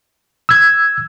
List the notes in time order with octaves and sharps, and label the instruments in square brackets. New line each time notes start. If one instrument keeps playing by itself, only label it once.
[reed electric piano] E6 G#6